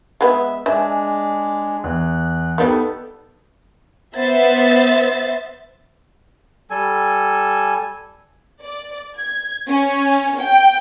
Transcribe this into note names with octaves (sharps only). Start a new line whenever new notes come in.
G#3 B3 E5
G#3 D4 E5 G#5
E2 F#6
D#3 G3 B3 A4
B3 C5 E5 A6
G3 A4 G#5
D5
G#6
C#4
G5